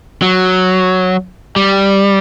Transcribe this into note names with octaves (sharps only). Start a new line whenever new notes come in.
F#3
G3